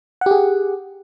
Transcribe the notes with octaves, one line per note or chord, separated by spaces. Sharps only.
G4 G#4 F#5